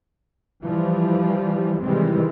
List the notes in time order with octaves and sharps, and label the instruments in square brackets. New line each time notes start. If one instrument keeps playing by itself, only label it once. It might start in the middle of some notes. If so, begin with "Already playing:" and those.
[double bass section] E3 F3 G3
C3 D#3 E3 G3 G#3 C4